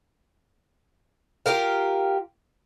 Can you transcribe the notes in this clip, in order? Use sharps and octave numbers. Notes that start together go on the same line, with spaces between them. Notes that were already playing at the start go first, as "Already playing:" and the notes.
F4 G4 A#4 F5